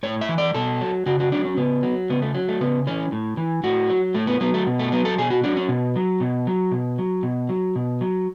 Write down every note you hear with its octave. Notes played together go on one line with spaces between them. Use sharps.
A2 C#5
E5
E3
D5
B2 A4
F#3
C#3 F#4
F#4
F#3 D4
C#4
C#3 B3
F#3
C#3 B3
A3
F#3
A3
C#3 B3
E3 C#4
A2
E3
A2 F#4
F#3
A2 A3
B3
F#3 B3
A3
B2
A3
F#3 B3
A4
B2 G#4
F#4
F#3 D4
C#4
B2
F#3
B2
F#3
B2
F#3
B2
F#3
B2
F#3